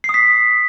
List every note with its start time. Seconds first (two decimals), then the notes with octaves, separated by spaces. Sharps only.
0.04 C7
0.09 D#6
0.14 B6